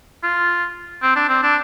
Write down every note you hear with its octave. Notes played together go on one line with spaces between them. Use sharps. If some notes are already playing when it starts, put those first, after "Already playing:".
F4
C4
D4
C4
D4